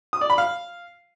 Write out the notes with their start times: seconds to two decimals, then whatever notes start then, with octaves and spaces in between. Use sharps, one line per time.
0.13 D#6
0.21 D5
0.30 B5
0.38 F5